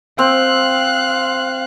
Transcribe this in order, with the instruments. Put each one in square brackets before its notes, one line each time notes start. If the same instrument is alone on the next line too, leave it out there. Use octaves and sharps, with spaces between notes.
[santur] C4 [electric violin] F5 F#6